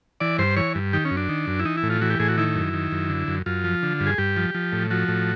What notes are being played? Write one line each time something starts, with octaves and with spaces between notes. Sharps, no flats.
E3 D5
G2 C5
E3 C#5
G2
D#3 G4
C#4
F#2
D4
D#3
F#2
E4
E3 D#4
E4
A2
F4
E3 F#4
G4
A2 G#4
F#4
D#3 E4
F#2
D#3
F#2
D3
F#2
F#2 F4
F3
D3
G2
G#4
G2 G4
F3
F3
A2
F3 F#4
A2